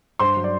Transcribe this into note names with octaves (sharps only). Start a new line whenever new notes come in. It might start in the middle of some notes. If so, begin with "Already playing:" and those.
G2 C5 C6
F#3
D5